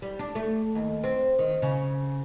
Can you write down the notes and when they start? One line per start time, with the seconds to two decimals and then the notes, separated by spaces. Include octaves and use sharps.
0.02 G3
0.19 D4
0.35 A3
0.75 D#2
1.04 C4
1.39 D#3
1.62 C#3